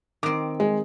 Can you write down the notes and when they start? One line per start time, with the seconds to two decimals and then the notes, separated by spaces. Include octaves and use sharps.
0.23 D#3 C4 D6
0.60 G#3